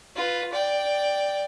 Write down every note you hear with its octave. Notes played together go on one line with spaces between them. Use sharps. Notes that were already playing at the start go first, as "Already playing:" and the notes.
F4 B4
D5 G5